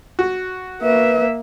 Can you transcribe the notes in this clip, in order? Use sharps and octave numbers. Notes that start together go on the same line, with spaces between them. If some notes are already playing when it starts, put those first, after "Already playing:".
F#4
A#3 B4 E5